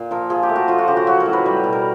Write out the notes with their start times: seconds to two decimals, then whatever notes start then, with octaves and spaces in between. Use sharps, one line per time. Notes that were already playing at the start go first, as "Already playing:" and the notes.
Already playing: A#2
0.11 F3 A#4
0.30 F3 G#4
0.43 G4
0.49 A3
0.56 F#4
0.68 F3 F4
0.78 F#4
0.87 C#3 G4
0.97 F#4
1.07 F#3 F#4
1.20 A#4
1.26 A2
1.33 B4
1.46 G3
1.64 B2
1.73 A#4